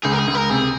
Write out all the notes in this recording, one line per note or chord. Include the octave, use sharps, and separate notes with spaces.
C#2 G#4
A#4
G#4
C#2
A#4
C3 G#4